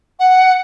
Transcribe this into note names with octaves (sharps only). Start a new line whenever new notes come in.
F#5